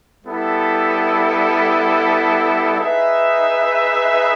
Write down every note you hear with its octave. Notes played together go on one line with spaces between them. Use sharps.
G3 B3 E4 A4
D#4 G#4 B4 E5